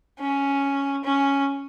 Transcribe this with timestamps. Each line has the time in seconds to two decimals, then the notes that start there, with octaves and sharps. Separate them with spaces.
0.19 C#4
1.04 C#4